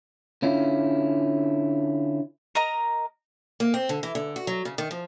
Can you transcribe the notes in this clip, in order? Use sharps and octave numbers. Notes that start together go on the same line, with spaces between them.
D3 C#4 E4 F4
A#4 D#5 A#5
A#3
C4
D3
E3
D3
F#4
F#3
C#3
D#3
F3